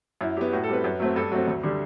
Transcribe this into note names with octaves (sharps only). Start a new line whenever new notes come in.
F#2 E4
F#3 B3 G4
A2 F#4
A4
G3 C4 B4
F#2
F#3 A3 C4
G2 A4
F#3 A3 C4 F#4
D2
D3 G3